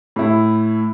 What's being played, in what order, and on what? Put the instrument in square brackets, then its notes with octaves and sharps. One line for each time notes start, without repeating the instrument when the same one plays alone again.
[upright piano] A2 E4